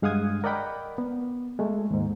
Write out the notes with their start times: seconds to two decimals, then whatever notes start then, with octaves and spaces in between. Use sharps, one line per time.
0.02 G2 G#3 F5 F#5 D#6 G#6
0.44 A#4 D5 D#5 F#5 G5 B5
0.98 B3
1.59 G#3 A3
1.91 D#2 G#2